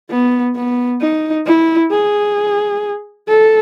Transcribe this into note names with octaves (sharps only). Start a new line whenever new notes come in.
B3
B3
D#4
E4
G#4
A4